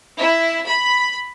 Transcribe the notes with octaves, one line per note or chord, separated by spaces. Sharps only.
E4
B5